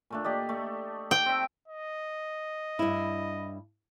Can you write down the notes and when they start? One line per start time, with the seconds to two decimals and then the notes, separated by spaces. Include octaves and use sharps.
0.10 A#2 A3 D4
0.24 G4 D5 D#5
0.49 A3
1.11 G5
1.26 C4 E5
1.68 D#5
2.79 G2 E4